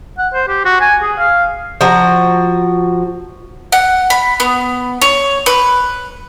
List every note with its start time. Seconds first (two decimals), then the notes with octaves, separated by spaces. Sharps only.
0.18 F#5
0.34 C5
0.48 G4
0.65 F#4
0.81 G#5
1.02 G#4
1.18 F5
1.81 F3 F#4 A#5
3.72 F#5
4.10 B5
4.40 B3
5.01 C#5
5.46 B4